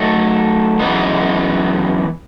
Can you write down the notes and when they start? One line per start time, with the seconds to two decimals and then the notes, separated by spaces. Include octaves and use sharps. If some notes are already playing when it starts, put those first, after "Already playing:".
Already playing: F#3 A3 D#4 A4
0.79 F#2 E3 G#3 B3 D#4